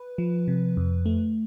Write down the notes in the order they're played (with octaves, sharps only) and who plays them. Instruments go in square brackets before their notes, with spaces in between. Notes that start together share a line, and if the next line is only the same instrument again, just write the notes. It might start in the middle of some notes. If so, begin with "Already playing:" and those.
Already playing: [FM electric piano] B4
F3
C3
F2
A3